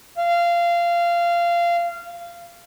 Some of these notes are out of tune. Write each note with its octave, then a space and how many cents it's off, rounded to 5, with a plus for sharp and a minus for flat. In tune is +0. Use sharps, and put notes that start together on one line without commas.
F5 -20